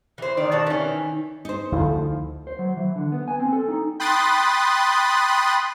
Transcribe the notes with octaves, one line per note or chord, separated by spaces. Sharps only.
E3 C5
D#3 D#4 D5
B2 F#4 A5
D#3 E3 C#4
D#4 C5
D2 F3 E4 A4 F5
C5
F#3
E3
D3
B3
G#5
C4
A4
D#4
G5 B5 C6 D#6 F#6 A6